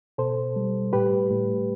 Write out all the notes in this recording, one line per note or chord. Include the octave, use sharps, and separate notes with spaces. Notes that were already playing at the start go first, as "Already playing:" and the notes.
B2 A4 C5
G3
A2 G4 B4
A2